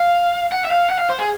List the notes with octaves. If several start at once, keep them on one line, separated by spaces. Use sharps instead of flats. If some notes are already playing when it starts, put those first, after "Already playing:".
Already playing: F5
F#5
E5
F5
F#5
F5
C5
G#4